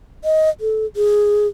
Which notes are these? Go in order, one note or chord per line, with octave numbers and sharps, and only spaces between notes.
D#5
A4
G#4